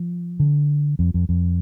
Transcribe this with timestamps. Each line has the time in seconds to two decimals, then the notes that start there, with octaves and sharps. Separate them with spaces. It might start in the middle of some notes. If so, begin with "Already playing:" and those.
Already playing: F3
0.40 D3
0.99 F2
1.14 F2
1.29 F2